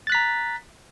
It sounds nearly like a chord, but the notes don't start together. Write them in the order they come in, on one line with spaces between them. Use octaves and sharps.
A6 F#6 B6 A#5